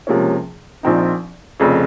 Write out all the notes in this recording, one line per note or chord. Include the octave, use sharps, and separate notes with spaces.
C#2 C3 F3 A#3 C#4
A#1 A#2 F3 C4 D#4
F1 F2 C#3